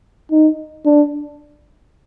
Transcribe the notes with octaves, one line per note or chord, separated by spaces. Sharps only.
D#4
D4